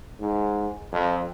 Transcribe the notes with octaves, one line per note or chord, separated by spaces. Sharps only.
G#2
F2